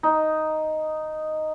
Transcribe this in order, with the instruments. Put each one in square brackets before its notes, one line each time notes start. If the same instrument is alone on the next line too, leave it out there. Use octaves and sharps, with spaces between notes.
[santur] D#4